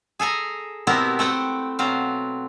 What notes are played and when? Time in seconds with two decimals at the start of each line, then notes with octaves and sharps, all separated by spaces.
0.19 G#4 A4 G#5 A#5
0.87 B2 B3 C4 E4 G4 A#4
1.19 A3 C4 F#5 G5
1.79 B2 F#3 C4 F5